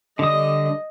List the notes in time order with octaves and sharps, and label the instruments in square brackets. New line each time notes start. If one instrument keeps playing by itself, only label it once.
[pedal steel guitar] D3 G3 D#6 [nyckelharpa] D#5